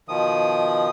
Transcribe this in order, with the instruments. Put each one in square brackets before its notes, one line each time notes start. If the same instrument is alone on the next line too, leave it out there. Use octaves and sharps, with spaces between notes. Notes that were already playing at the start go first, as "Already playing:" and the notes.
[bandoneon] B2 D#3 F3 D#6